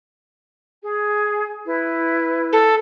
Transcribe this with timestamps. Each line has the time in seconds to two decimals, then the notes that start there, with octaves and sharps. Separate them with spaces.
0.83 G#4
1.66 E4 B4
2.53 A4